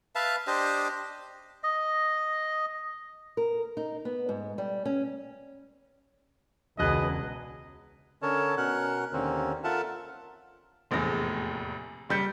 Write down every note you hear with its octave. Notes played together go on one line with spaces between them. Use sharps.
B4 E5 F5 A5
D4 G4 C5 D#5
D#5
A#4
D#4
B3
G#2
G3
C#4
E1 C#2 F#4 G#4 B4 D#5 F#6
D3 C#4 A4 A#4 C#5 A5
B2 C#4 A#4 F#5 F#6
D#2 D3 A#3 C4 C#4
F4 A4 A#4 E5 F#5 A5
F1 A#1 E2 A2 A#6
F#1 G3 G6 C#7